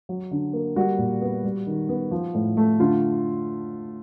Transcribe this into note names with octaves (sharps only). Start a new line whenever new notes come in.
F#3
D3
A#3
G3 F#4
A#2
B3
G3
D#3
B3
F3
A2
A3
D3 F4